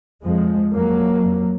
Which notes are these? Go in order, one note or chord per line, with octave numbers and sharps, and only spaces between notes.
F2 F3 G#3
F2 F#3 A#3
F2